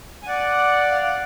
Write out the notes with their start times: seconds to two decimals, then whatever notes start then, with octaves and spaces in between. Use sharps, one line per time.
0.23 G#5
0.27 D5 F#5
0.91 F5
1.01 D5 F#5